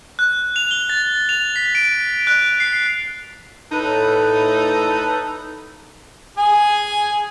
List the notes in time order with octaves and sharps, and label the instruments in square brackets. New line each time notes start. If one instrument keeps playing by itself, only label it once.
[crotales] F#6
F7
G7
A6
F7
B6
D7
F#6
C7
[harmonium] A2 [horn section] D#4 A4 B4
[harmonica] G#4 G#5